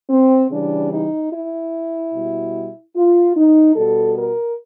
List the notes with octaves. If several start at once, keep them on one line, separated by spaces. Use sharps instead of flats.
C4
C#3 E3 G3 D4
D#4
E4
B2 G3
F4
D#4
B2 G3 A4
A#4